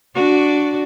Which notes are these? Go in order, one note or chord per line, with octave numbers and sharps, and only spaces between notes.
D4 F#4 D5